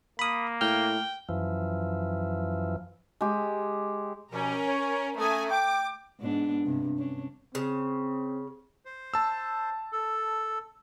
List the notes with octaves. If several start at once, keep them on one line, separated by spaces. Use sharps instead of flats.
A#3 B5 D#6
A2 G5 F6
F#2 E3 F3
G#3 G4
B2 F3 G3 C#4 A#4
C#5
A3 C#4 G#5 A#5 D#6
G5 D6
G#2 B3 D4
G2 C3
C#4 D4
C#3 C4
C5
A5 E6
A4